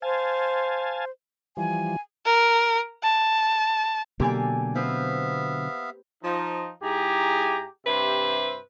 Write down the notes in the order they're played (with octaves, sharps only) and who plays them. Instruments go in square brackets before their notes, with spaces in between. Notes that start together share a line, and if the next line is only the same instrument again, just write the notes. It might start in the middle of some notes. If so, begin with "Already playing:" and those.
[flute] C5 [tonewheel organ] F5 G#5 A5
[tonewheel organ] E3 F3 G3 [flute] G#5
[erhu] A#4
A5
[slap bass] B2 D3 F#3 [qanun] A#3 A4 D5 [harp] G4 G#5
[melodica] B3 E5 F5 [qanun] C4 B4 C5
[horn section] F3 D#4
G#2 E4 G4 G#4 G#5 A#5
G2 C3 G4 B4 C5 E5